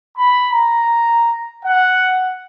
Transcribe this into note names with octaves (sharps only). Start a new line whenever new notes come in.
B5
A#5
F#5